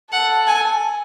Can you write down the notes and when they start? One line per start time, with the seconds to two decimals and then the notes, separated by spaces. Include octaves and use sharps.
0.12 A4 F#5
0.47 G#5